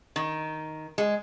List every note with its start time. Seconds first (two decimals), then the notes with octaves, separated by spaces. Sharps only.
0.16 D#3
0.98 G#3